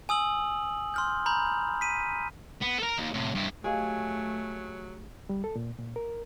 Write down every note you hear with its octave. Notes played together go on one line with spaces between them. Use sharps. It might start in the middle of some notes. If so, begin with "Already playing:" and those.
G#5 D#6 E6 F#7
C6 F6 G6
A#5 B5 G6
B6 D#7
B3
A4 A#4
D#2
A2 C3
G2 E4
F#3 A3 G4 G#4 D#5 F5
G3
A4
A#2
A#2
A#4